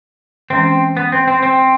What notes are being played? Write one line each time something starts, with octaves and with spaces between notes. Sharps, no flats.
E3 G#3 C4 C#4
B3
C4
C4
C4